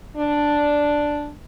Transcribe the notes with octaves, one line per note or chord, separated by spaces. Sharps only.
D4